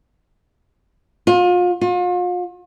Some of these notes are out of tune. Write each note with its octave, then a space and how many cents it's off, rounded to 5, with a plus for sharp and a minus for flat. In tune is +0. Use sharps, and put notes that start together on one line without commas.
F4 +35
F4 +40